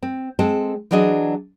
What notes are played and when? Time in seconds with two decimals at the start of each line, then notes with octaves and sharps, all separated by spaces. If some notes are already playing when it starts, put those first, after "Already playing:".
0.03 C4
0.39 G#3 C4 A4
0.91 E3 F#3 D4 G#4 D#5